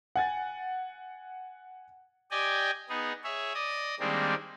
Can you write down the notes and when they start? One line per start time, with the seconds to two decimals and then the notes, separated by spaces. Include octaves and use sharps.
0.16 F#5 G#5 A6
2.31 G4 D5 D#5 G5 G#5
2.89 B3 D#4 G#4
3.24 G#4 C#5 E5
3.54 D5 D#5 D#6
4.00 D#3 G3 G#3 A#3 C4 D4